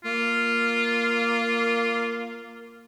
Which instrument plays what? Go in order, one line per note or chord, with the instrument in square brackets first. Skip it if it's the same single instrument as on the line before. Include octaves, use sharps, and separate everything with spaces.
[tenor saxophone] A#3 [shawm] F4